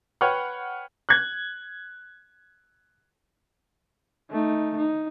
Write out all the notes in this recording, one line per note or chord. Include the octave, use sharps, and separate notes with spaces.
B4 C#5 F#5 G5 F6
F#6 G#6
A3 D#4
D#4